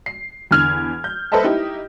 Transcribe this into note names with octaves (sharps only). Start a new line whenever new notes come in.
C7
E2 D3 F6 G#6 F7
G6
A4 B4 C5 D#5 E5 A5
D#4 E4 G4